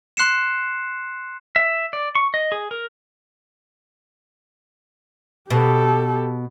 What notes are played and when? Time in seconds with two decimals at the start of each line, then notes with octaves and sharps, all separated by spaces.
0.17 C6 F#6 C7 C#7 E7
1.56 E5
1.93 D5
2.15 C#6
2.34 D#5
2.52 G#4
2.71 A#4
5.50 B2 G4 A4